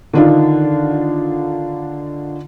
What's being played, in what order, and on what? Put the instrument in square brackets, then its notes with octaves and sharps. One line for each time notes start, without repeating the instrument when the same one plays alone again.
[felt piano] D3 D#3 D4 D#4 F4